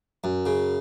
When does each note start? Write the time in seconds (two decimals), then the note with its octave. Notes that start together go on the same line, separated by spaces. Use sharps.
0.24 F#2
0.46 C#3